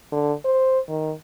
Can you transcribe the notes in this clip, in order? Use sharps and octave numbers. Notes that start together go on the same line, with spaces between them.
D3
C5
D#3